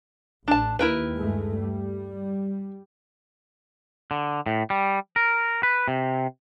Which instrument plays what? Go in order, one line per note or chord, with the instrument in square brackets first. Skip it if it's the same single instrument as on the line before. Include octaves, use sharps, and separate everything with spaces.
[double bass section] A1 [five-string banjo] D4 A5
[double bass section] D#2 [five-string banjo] E4 A#4 B4
[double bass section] G2 G#3 A3
G3
[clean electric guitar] D3
A2
G3
A#4
B4
C3